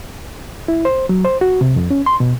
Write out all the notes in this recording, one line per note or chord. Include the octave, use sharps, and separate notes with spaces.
E4
C5
F#3
C5
F#4
C3
F2
C#4
C6
B2